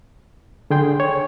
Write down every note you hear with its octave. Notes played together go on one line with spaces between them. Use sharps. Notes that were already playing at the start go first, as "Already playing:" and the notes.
D3 G#4 G5 C6
C#5